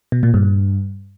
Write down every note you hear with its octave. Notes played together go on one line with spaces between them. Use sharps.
B2
A#2
G2